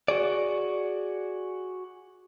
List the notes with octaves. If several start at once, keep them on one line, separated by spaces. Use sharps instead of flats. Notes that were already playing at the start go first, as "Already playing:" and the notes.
F#4 G#4 D5